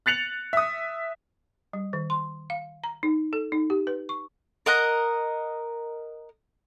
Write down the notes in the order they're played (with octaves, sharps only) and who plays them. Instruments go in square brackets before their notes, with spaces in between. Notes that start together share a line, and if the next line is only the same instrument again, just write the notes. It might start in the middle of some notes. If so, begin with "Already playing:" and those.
[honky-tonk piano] F#6 A6 C#7 F7 F#7
E5 D#6
[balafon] G3
D#3
C6
F5
A#5
D#4
A4
D#4
G4
B4
C#6
[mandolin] A#4 D#5 F#5 A#5